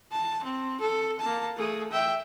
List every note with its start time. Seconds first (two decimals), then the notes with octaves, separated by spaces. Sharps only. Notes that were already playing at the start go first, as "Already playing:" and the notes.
0.12 A5
0.44 C4
0.80 A4
1.19 A#3 A5
1.57 A3 G#4
1.92 E5 G5